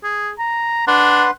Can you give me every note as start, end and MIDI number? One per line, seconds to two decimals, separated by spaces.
0.03 0.31 68
0.39 0.87 82
0.87 1.26 62
0.87 1.31 71
0.87 1.31 78
0.87 1.31 84